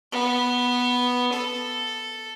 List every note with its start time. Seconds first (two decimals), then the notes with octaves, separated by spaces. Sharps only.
0.12 B3
1.32 A4